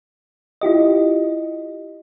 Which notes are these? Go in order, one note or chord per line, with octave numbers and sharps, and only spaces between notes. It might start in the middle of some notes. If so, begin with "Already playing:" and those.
E4 F4 G4 D#5